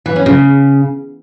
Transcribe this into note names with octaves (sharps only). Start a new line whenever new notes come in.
E3
C#4
C#3